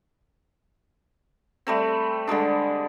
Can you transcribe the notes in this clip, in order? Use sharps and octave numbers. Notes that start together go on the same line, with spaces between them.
G3 A3 C4
D3 G3 G#3 D4